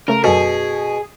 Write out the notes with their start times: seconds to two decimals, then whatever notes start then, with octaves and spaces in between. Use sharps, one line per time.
0.08 C#3 A3 A#4
0.24 F#2 B2 G#4 A4